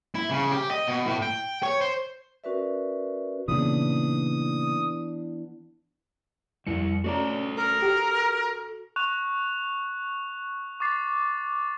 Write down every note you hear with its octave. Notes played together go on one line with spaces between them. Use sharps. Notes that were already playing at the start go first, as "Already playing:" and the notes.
E4
C#3
G4
D#5
B2
A2
G5
C#5
C5
C#4 F#4 A#4 B4 D5 E5
A#2 C#3 E3 B3 D4 D#6
F2 G3 E4 C#7
A3 C#4 F#4 A4 D5 A#5
A#4
G4
C#6 F#6 F7
C#6 D6 A6 C7